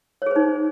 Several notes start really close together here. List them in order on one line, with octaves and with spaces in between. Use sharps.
C#5 G#4 C5 D#4